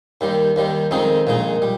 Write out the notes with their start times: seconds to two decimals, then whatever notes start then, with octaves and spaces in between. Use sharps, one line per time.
0.21 D#2 D#3 G3
0.56 D#2 D#3 G3
0.91 F2 D#3 G#3 C4 D#4
1.27 A#1 A#2 G#3 D#4
1.62 G3